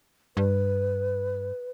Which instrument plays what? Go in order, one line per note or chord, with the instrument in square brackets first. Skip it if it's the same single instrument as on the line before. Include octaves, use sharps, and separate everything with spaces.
[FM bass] G2 [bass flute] B4